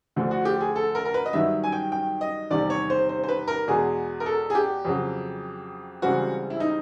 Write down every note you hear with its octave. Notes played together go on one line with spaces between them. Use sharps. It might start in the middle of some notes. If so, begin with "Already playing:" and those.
D2 D3 F3
F#4
G4
G#4
A4
A#4
A#4
B4
D#5
G2 D#3 F#3 E5
G#5
G5
G5
D#5
E2 C3 D#3 G3 D5
C#5
C5
C5
C5
B4
A#4
E2 B2 G#3 G#4
A#4
A4
G#4
G4
F2 C#3 F#3
C#2 C#3 E3 G3 C4 F#4
E4
D#4